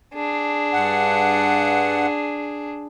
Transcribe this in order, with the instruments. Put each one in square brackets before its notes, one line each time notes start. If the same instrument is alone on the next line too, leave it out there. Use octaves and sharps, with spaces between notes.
[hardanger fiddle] D4 G#4
[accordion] G2 F#5